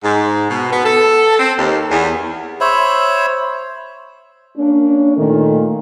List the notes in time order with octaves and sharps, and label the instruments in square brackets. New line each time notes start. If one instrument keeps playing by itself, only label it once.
[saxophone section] G#2
B2
B3
A4
C4
D#2
E2
[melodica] C5 C#5 E5 B5
[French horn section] A#3 C#4 D4
A#2 D#3 A3